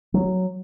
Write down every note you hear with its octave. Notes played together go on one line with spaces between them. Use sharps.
F#3